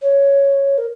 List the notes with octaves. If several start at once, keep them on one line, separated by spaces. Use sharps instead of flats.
C#5
A#4